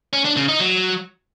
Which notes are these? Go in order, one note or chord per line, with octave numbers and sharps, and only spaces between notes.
C#4
D4
C#3
D#4
F#3